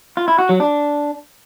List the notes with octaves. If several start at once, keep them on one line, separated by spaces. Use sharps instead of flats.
F4
E4
F#4
F#3
D4